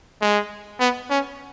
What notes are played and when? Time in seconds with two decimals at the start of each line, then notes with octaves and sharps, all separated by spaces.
0.21 G#3
0.80 B3
1.10 C#4